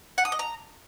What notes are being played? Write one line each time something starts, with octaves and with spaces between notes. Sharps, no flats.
F#5
D#6
D#5
A#5